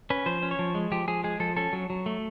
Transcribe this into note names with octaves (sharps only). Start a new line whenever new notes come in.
C#4 B4
F3 C5
C#4
C#5
F3
G#3
F3 G4
F3 G#4
G#3 G#4
F3 A4
C#4 A4
F#3
F#3
A3